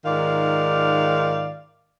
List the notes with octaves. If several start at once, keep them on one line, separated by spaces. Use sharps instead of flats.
G#2 D#3 F4 D5 F5